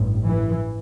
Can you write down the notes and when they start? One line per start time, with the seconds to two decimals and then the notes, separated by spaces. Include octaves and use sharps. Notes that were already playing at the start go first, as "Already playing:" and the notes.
Already playing: A1 G2
0.29 E3